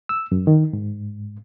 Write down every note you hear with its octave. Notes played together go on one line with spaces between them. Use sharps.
E6
F#2
D#3
G#2